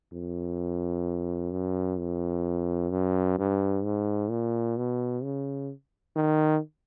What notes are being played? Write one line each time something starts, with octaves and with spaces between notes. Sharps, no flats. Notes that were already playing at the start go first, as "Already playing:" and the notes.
F2
F#2
F2
F#2
G2
G#2
A#2
B2
C#3
D#3